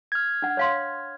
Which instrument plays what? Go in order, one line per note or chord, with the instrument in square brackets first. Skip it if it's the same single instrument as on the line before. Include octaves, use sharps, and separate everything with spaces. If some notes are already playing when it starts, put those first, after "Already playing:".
[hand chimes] F6 G#6
[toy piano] D4 F#5
C#5 F5 C6